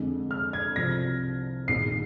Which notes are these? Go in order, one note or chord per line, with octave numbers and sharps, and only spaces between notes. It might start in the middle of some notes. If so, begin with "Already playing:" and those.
Already playing: F2 D3 G#3
F6
G#6
C2 C3 F3 A#6
A#1 G#2 D#3 C7